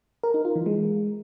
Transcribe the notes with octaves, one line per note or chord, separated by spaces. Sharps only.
A#4
D#4
F4
E3
G#3